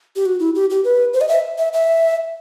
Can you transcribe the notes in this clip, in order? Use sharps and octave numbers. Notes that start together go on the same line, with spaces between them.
G4
F#4
E4
G4
G4
B4
C5
D#5
E5
E5
E5